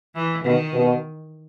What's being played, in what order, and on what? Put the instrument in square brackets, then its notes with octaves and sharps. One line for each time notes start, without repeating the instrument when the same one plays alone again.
[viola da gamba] E3
[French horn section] B2 [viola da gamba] D#3
[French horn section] B2